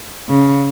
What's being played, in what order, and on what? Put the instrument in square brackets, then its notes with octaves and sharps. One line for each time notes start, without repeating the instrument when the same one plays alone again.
[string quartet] C#3